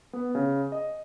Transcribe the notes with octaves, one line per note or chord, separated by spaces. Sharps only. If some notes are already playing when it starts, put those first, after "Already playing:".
B3
C#3
D#5